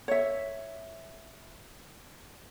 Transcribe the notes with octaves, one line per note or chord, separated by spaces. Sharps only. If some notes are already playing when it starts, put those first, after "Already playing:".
C#5 E5